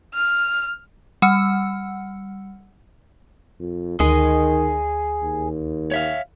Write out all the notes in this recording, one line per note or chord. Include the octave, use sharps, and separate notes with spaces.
F6
G3 F#5 E6 C#7
F2
D2 D#3 G#4 D#5
D#2
C#5 E5 F5